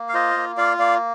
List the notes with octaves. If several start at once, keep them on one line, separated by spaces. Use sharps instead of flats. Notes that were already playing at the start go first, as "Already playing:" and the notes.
Already playing: A#3
F5
F4 C5 D#5
A#3
F4 D5 F5
A#3 D5 F5